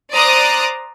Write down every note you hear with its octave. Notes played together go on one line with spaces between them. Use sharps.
C5 D5 A#5 D6 D#6 F#6